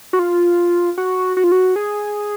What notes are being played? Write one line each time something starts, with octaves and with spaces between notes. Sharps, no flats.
F#4
F4
F#4
F#4
F4
F#4
G#4